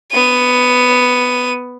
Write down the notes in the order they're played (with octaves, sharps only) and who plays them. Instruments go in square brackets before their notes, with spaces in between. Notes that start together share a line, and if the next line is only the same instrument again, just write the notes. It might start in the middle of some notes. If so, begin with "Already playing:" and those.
[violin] B3 D#7